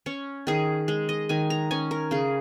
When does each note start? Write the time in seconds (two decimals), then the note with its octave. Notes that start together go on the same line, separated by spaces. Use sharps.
0.06 C#4 C#5
0.47 D#3 G#4
0.88 G#3
1.09 D#5
1.29 D#3 G#5
1.50 A#5
1.71 C#4 G#5
1.91 A#4
2.11 C#3 G#4